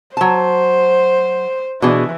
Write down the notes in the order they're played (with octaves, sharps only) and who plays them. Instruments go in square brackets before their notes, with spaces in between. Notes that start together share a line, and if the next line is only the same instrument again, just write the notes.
[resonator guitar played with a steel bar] F#3 A5 [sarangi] C5
[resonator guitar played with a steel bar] B2 D4 G#4 [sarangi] E3